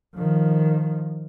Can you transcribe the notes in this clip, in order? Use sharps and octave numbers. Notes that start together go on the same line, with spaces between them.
D#3 F3